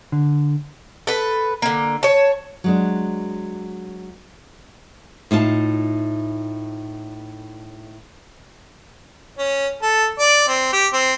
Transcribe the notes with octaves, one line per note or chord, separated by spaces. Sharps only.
D3
A4 B4
D3 A#3
C#5 A5
F#3 G#3 D4
A2 D#4 F4 A5
C#4
A4
D5
C4
G4
C4